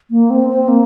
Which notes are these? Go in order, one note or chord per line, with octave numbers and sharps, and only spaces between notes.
A#3
C4
C4
A#3